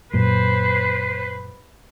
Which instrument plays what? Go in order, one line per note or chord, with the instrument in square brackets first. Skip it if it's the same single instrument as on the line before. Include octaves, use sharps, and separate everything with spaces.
[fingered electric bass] F#2 A#2 [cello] B4 C5